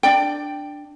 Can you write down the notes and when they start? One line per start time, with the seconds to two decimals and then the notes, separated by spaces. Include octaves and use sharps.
0.03 D4 D5 G5